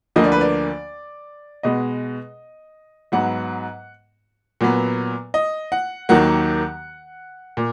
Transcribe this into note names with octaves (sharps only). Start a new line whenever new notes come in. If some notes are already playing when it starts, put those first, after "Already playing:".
D2 D3 F3 A#3 D#5
D5
B4
D5
B2 G#3 B3 D#5
G#2 F#3 B3 F#5
A#2 F#3 B3
D#5
F#5
D#2 D#3 F#3 A#3 F#5
A#2